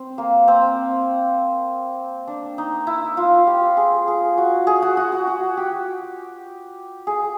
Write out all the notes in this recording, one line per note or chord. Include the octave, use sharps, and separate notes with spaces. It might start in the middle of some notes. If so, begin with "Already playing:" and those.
Already playing: C4
A#3
C4
D4
D#4
E4
F4
G4
G#4
G#4
F#4
G#4
F#4
F#4
F#4
F#4
G4
G#4